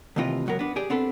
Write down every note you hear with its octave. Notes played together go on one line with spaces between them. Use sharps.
D#2 A2 C3 E3 F4 D#5
C#2 F#2 F#3 B3 A#4
B3 D4
G4 G#4 D5
B3 C4 D4 A4 B4